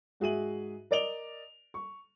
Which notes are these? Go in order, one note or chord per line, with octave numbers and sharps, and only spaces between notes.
G#2 F#4 G#4 E5 D#7 F#7
A#4 D5 D#5 D7 F7 G7
C#6